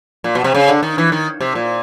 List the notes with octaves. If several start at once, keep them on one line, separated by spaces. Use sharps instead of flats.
A#2
B2
C3
C#3
D3
D#3
E3
D#3
C3
A#2